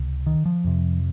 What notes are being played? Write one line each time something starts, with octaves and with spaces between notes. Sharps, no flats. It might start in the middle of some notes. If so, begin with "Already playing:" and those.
Already playing: C#2 C3
D#3
F3
F2 C3